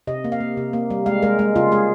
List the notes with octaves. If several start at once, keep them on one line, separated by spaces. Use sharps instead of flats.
C3 D#5
A#3
F5
A#3
C3
A#3
G3
G#3 F5
G#3 A#4
G#3
C#3 F4
G#3 G#4